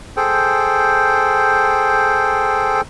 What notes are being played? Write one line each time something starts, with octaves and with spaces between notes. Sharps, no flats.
G#4 A4 C5 G5